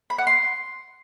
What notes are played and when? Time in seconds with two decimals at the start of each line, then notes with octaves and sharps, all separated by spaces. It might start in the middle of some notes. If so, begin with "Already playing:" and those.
0.10 B5
0.18 F#5
0.27 C6